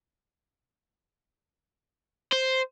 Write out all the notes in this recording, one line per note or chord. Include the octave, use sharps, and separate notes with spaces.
C5